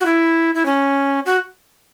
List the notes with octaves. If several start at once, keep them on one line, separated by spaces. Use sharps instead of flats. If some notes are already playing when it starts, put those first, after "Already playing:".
F#4
E4
E4
C#4
F#4